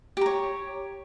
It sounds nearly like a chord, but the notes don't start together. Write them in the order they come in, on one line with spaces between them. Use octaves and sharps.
G4 A#5 C#5